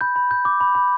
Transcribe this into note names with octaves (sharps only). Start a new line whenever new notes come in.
B5 G6
B5
G6
D6
B5
B5